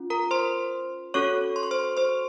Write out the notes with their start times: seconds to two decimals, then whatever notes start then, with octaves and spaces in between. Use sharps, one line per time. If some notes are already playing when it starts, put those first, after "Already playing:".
Already playing: C#4 F4
0.10 A#4 A#5
0.31 C5 C6
1.14 C#4 F#4 A4 C#5 C#6
1.56 C6
1.63 C#6
1.71 C5 C6
1.97 C5 C6